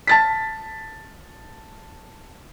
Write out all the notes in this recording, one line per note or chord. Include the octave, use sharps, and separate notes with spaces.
A5 A6 B6